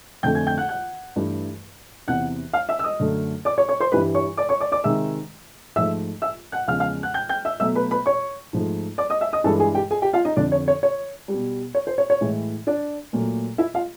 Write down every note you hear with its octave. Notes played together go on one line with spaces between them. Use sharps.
F2 D3 F3 A3 G5 G6
G#5 G#6
G5 G6
F#5 F#6
F#5 F#6
G2 E3 A3
E2 C3 E3 F#5 F#6
F5 F6
E5 E6
E6
D#5 D#6
F#2 D3 F#3 A3
D5 D6
C#5 C#6
C#5 C#6
C5 C6
G2 E3 G3 B4 B5
C#5 C#6
D5 D6
C#5 C#6
D5 D6
D5 D6
C3 D#3 G#3 E5 E6
G#2 F3 A3 E5 E6
E5 E6
F#5 F#6
E2 C#3 F3 G#3 F5 F6
F5 F6
F#5 F#6
G5 G6
G5 G6
E5 E6
B2 F#3 A3 E5 E6
B4 B5
B4 B5
C#5 C#6
G#2 F3 A3
D5 D6
D#5 D#6
E5 E6
D#5 D#6
G2 E3 G#3 A4 A5
G#4 G#5
G4 G5
G#4 G#5
G4 G5
F4 F5
D#4 D#5
F2 D3 F3 D4 D5
C#5
C#5
C#5
G3
B2
C#5
C5
C#5
C#5
A2 E3 G#3
D4 D5
A#2 F#3 A3
E4 E5
F4 F5